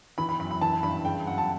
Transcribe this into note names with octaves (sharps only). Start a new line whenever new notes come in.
E3 B5
B5
F#2 B5
B5
E3 A5
G2 B5
C#3 G5
F#2 F#5
A5